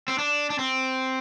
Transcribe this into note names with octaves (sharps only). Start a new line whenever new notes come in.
C4
D4
D4
C4